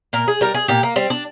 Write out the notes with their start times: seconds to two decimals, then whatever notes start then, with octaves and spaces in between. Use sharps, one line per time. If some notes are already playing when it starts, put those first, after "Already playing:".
0.13 A#2 A#4
0.28 G#4
0.41 G3 A#4
0.54 G#4
0.68 A#2 G4
0.83 A#3
0.96 G3 C4
1.10 D4